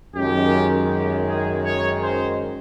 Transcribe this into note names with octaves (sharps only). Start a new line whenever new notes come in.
F#2 D#3 G#3 G4
G4
G#4
C#5
C5